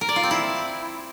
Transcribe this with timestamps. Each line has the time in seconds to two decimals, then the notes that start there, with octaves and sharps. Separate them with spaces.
0.01 A#4
0.09 D5
0.16 F4
0.23 C4
0.31 E4